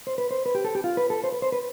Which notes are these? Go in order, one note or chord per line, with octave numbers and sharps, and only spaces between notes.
C5
B4
C5
B4
G4
A4
G4
F4
B4
A4
C5
B4
C5
B4